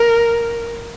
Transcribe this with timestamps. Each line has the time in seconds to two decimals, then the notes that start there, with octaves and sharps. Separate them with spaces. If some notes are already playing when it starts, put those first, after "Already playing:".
Already playing: A#4